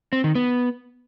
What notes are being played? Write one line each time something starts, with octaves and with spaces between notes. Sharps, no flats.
C4
D#3
B3